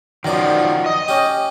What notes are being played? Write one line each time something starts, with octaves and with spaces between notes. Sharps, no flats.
F#2 B2 D#3 F3 D5
D#5
C#4 G4